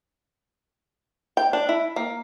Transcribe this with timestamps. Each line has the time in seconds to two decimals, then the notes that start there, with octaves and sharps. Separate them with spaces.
1.37 G5
1.53 D4
1.69 E4
1.96 A#3